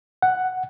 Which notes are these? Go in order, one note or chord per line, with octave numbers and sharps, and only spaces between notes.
F#5